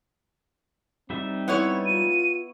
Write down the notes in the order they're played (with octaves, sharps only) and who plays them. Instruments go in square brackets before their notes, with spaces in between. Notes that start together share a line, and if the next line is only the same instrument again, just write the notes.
[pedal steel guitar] G3 D#4 E5 [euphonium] C4
[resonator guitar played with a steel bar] B3 E4 C#5
[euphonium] F4 [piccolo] D#7